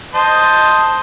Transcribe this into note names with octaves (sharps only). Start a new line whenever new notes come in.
C5 D#5 A5